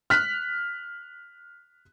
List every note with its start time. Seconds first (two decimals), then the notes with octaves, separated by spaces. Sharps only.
0.10 F6 F#6 B6